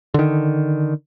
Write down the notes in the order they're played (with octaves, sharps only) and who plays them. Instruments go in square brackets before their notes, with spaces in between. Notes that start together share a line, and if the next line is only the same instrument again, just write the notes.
[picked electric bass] D3 D#3